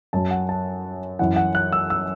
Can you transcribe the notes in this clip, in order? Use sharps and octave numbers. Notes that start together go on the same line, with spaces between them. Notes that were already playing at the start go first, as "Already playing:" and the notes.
F#2 F#3 A5
F#5
A5
F#2 E3 F#5
F#5
F#6
E6
E6